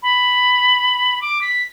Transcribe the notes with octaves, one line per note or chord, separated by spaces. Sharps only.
B5
D6
B6